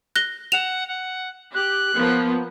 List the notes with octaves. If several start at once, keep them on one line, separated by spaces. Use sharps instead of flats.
F#6 A#6 G7
F#5 E7 F7
F#5
G4 F#6
F3 A#3 B3